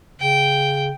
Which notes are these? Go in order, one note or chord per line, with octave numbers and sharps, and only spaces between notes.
C#3 G5